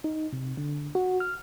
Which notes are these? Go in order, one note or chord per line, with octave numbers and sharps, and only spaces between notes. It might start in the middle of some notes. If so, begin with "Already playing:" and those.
D#4
C3
D3
F#4
F6